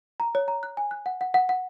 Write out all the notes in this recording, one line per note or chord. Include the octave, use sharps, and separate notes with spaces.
A#5
C#5
A#5
F#6
G#5
F#6
F#5
F#5
F#5
F#5